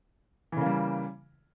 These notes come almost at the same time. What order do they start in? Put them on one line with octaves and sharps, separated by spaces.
E3 C#3 A#3 G3